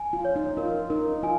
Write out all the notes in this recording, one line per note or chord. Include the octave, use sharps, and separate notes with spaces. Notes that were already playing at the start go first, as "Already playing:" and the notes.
Already playing: G#5
F4
C#5
D#4
F4 A#4
D#4 A#4
F4 G#5